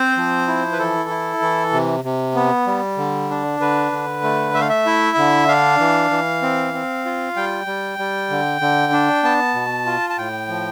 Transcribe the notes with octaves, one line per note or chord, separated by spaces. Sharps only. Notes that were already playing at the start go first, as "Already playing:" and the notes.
Already playing: C4 C5
F3
E4
B4
E3 A4
E4
E3
C3
C3
B3
G3
D3
D4
D3 B4
D3
A3
A3 E5
F5
E5
E4
D3
D4 F5
E3
E3
C4
C4
F4
G3 G5
G3
G3
D3
D3
D4
B3 A5
B2
F4
A5
A2 G5
F3